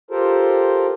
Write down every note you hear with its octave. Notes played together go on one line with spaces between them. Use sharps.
F4 G4 A4 A#4 C5